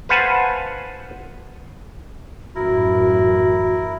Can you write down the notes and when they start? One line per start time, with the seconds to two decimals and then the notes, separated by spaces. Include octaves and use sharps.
0.09 B4 C5 F5 F#5 G#5 A5
2.55 A1 F#2 E4 F#4 A#4